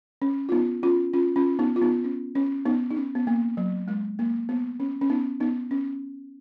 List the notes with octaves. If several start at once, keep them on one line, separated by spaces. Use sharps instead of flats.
C#4
F4
B3 D#4
C#4 F4
C#4 F4
C#4 F4
B3 D#4
F4
B3 D#4
C#4
C#4
B3 D#4
D#4
C#4
B3
A#3
F#3
G#3
A#3
B3
C#4
C#4
B3 D#4
B3 D#4
C#4